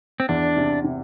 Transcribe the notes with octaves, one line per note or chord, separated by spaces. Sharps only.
C4
E2 D4
C3
C3